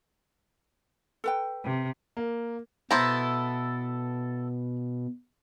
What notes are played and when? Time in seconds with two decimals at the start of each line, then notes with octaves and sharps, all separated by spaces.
1.24 A4 B4 G5
1.63 C3
2.17 A#3
2.91 B2 B3 E4 A4 C5 A#5